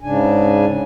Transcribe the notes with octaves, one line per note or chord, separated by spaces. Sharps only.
G#2 C#3 D4 G#5